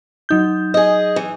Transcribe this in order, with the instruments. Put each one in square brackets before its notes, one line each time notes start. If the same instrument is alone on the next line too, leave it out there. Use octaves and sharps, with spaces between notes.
[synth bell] F#3 D#4 G6
[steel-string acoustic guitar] G#4 D#5
E3